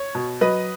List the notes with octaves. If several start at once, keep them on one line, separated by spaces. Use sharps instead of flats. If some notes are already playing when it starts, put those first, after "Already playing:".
Already playing: C#5
B2
F#3 B4 D#5